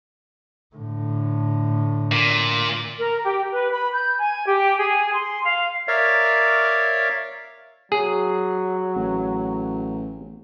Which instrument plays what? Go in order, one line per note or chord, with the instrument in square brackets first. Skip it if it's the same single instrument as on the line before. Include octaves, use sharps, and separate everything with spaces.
[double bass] A2 D3
[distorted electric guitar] A#2
[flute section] A#4
G4
B4
B5
G6
G#5
G4
G#4
C6
F5
[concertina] A#4 C#5 D5 E5 F5
[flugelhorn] F#3 [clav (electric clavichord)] G#4
[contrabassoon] A1